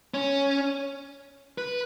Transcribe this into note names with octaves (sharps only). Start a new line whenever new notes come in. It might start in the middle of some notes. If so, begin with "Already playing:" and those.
C#4
B4